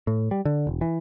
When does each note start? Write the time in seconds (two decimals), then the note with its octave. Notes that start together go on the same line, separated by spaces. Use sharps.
0.07 A2
0.31 G3
0.45 D3
0.67 E1
0.81 E3